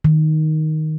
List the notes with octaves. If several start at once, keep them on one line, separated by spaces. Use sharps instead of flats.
D#3